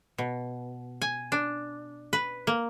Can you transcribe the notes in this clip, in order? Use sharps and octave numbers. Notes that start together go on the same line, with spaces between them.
B2
G#5
D4
B4
A#3